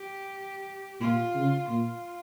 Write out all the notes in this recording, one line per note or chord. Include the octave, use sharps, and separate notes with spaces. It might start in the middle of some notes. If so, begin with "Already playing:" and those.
Already playing: G4
A#2 F4
C#3
A#2 F4